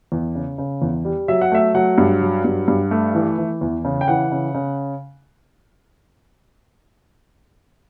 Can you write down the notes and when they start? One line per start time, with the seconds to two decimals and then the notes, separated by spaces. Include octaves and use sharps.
0.12 E2
0.35 C#3
0.58 C#3
0.82 E2
1.05 G3
1.28 F#3 E5
1.41 F#5
1.52 A3 E5
1.74 F#3 F#5
1.98 G2
2.21 F#3
2.44 G2
2.68 G2
2.91 A3
3.15 E3
3.38 E3
3.61 E2
3.85 C#3
4.01 G5
4.08 E3 F#5
4.32 C#3
4.55 C#3